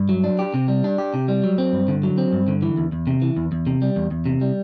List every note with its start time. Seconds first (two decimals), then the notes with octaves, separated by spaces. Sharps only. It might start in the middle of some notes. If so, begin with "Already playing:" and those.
Already playing: G2
0.09 F#3
0.24 D4
0.39 G4
0.54 C3
0.68 G3
0.84 D4
0.98 G4
1.14 C3
1.28 G3
1.44 F#3
1.58 C4
1.73 G2
1.88 D3
2.03 F#3
2.18 C4
2.33 G2
2.48 D3
2.62 E3
2.77 E2
2.92 E2
3.07 C3
3.22 E3
3.37 E2
3.52 E2
3.67 C3
3.82 G3
3.96 E2
4.11 E2
4.26 C3
4.41 G3